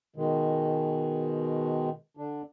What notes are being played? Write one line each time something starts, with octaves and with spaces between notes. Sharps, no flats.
B2 D#3 G#3
D3 D4